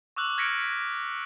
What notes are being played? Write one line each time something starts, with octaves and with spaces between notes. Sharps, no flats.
C#6 D6 E6 F#6 F#7
F6 G#6 A#6 B6 C#7 D7